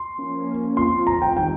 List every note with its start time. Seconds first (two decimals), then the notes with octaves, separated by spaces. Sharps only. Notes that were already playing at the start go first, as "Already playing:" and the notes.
Already playing: C6
0.17 F3 A#3 C#4
0.77 F3 C4 F4 C6
1.07 A#5
1.22 G5
1.36 D#3 G3 C4 D#4 G5